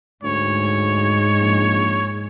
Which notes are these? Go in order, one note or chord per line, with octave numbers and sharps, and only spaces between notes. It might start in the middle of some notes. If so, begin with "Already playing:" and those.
D2 G#2 C#5
A#1